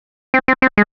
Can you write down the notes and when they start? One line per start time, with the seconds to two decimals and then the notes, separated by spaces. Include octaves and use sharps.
0.34 C4
0.48 C4
0.62 C4
0.78 G#3